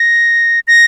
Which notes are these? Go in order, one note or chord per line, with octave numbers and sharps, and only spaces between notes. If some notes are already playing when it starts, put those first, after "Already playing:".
Already playing: A#6
A#6